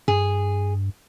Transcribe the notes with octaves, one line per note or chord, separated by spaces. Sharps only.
G2 G#4